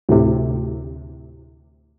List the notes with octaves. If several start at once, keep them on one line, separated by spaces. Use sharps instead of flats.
D2 A2 C3